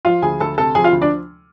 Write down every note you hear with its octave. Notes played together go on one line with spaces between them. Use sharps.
F3 F4 F5
D2 G#4 G#5
D2 A4 A5
C3 A4 A5
F3 G#4 G#5
F4 F5
D2
D4 D5